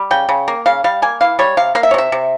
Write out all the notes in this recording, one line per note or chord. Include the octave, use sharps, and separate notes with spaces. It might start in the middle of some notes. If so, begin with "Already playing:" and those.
Already playing: G3
C#3 G5
C#3
A#3
C#3 F5
G3 F5
A#3 G#5
E3 F5
G3 C#5
C3 F5
A#3 F5
E5
C#5
C3 E5
C3